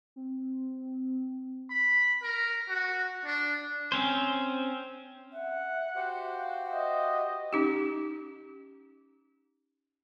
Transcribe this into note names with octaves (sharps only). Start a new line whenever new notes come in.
C4
B5
A#4
F#4
D4
C4 C#4 C5
E5 F#5
F#4 G4 C5
F5
D#5 E5
C#4 D#4 G4